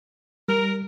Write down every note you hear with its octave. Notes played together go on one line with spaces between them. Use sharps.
G3 A#4